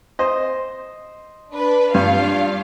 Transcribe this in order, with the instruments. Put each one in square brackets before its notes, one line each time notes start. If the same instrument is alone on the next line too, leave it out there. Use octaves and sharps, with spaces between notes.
[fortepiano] C5 D#5
[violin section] D4 B4
[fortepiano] G2 [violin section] D4 F4 F5